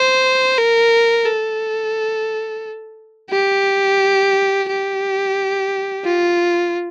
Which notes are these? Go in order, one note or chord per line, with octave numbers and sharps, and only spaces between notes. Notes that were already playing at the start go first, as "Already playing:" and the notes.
Already playing: C5
A#4
A4
G4
G4
F4